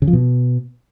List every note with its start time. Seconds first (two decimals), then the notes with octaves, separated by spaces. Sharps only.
0.02 C#3
0.08 F3
0.13 B2